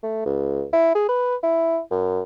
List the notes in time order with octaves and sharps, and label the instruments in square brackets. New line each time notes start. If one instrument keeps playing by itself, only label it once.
[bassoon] A3
C#2
E4
G#4
B4
E4
F#2